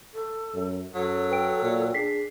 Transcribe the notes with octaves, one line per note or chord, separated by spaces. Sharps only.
A4
F#2
F#2 F#3 A4
B4 G5 D7
A#2
D4 G#4 B6 C7